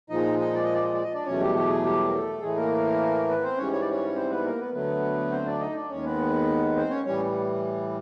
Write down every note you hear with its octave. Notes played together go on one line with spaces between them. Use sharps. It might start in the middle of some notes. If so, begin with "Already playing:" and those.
A#2 F3 G#3 D#4 D#5
D#4 D#5
D5
D#5
D5
D#5
D5
D#5
D4 D5
E2 B2 F#3 A3 C#4 C#5
G3 G4
G4
G#4
G3 G4
A#4
A3 A4
A2 E3 G#3 A3 G#4
A#3 A#4
B3 B4
C4 C5
G#2 E3 G3 C#4 C#5
C#5
D5
C#4 C#5
C4 C5
B3 B4
A#3 A#4
B3 B4
D2 D3 F#3 A3 B3 B4
C4 C5
D4 D5
D#4 D#5
D4 D5
D#2 D#3 G#3 C#4 C#5
B3 B4
C4 C5
C#4 C#5
A2 E3 G3 C#4 C#5